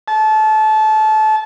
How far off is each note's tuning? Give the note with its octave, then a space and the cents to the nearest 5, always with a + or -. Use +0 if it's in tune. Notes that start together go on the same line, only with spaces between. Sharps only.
A5 -25